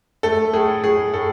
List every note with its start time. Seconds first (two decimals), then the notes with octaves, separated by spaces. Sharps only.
0.23 A3 A4
0.54 A2 G#4
0.83 A2 G#4
1.14 A2 A4